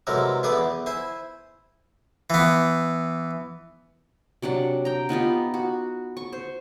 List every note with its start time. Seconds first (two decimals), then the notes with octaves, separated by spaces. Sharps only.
0.07 C3 E3 F#3 G#3 A3 A#4
0.43 E3 A3 B3 G#4 D5 D#6
0.58 E2
0.86 E4 C5 G#5
2.30 E3 B3
4.42 C3 F#3 D4 F#5
4.85 G5 A#5
5.09 B3 D#4 F4 G4
5.54 F#4
6.17 C#6
6.32 C5